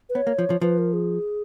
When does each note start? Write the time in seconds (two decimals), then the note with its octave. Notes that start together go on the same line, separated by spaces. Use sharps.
0.09 B4
0.15 B3 C#5
0.27 A#3
0.38 F3
0.50 F3
0.62 F3 B4
0.78 A#4
0.93 G#4